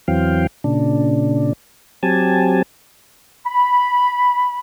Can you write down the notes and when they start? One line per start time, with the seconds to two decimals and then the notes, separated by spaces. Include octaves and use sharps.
0.08 E2 E3 F#3 C4 F5 G5
0.64 A#2 C#3 D4
2.03 F#3 C4 G4 G#5 A5
3.46 B5